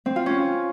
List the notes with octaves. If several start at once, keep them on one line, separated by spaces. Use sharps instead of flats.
C4
F4
C#4